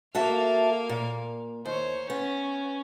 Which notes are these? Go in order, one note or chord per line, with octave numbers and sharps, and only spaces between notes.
A#3 F#4 A4 E5 F5
A#2
D#2 C5 C#5
B3 C#4